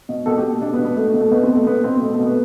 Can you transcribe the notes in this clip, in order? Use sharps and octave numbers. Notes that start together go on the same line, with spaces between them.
B2
B2 A4
G4
B2
B2 D4
B3
B2
B3
B2 A3
B2
A3
B2 B3
C4
B2
A3
B2 B3
B2 C4
B2 A3
A3
B2
B3